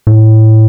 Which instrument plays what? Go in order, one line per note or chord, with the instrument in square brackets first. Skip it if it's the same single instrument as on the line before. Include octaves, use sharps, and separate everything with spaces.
[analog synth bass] A2